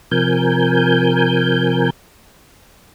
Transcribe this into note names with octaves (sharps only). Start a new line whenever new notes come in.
C3 F3 A#4 G#5 G6